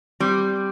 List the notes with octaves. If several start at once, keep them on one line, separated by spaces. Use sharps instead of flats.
G3 C4